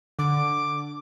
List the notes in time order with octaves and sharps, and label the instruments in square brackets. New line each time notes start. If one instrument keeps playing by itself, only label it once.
[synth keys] D3 [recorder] D6